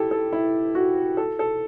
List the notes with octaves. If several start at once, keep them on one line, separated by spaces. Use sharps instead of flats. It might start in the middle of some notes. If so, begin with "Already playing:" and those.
Already playing: E4 G4 A4
A4
E4
F#4
A4
A4